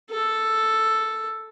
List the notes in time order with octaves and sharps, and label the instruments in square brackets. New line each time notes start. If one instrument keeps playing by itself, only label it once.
[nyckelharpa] A4